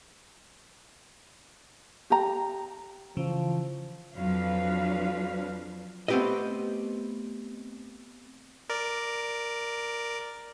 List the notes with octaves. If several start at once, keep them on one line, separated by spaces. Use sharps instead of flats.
G4 A#5
C#3 E3 F3
F2 F3 F#3 D4 B4 F5
A3 B3 C4 G4 B4 D#5
A#4 D5